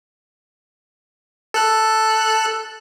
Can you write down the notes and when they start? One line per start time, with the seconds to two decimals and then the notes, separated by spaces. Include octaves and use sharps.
1.54 A4 F#6